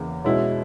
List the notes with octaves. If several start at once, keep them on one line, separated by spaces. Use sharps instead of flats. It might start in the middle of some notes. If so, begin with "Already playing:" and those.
Already playing: E2 C#3 E3 A#3
B2 G#3 C#4 E4